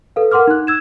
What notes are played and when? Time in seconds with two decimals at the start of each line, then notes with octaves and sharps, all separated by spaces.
0.16 A4 B4 F5
0.31 A#4 F#5 C6 D6 F6
0.47 D#4 F#6
0.67 E6 G#6 E7